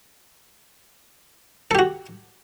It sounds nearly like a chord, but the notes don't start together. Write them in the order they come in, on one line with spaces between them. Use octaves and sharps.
A4 G4 F#4